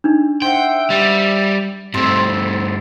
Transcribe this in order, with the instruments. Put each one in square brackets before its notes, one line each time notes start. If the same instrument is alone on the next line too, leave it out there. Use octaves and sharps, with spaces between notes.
[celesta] D4 D#4
[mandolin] C5 E5 F#5 [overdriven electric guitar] G5
[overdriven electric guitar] G3
[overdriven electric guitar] G2 A3 [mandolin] C4 C5